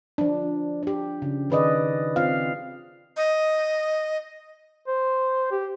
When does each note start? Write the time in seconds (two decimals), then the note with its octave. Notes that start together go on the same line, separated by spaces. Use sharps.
0.18 F3 D4
0.83 D4 G4
1.22 C#3
1.50 D#3 G#4 B4 D5 D#5
2.16 C4 F4 F5
3.17 D#5
4.87 C5
5.51 G4